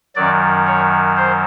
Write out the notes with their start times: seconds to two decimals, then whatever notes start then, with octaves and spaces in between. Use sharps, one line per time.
0.16 F#2 D#3 F#3 D5
0.67 C#5
1.17 C5